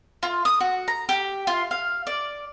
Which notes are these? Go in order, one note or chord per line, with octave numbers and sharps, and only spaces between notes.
F4
D#6
F#4
A#5
G4
F4
F5
D5